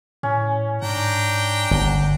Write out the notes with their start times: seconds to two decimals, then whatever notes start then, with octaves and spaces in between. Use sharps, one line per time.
0.23 A2 C#4
0.82 G#2 D4 G5 A#5
1.71 G1